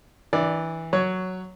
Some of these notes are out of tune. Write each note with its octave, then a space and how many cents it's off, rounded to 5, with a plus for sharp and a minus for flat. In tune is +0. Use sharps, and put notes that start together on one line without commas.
E3 -15 D4 +10 D5 +0
F#3 +0 C#5 +10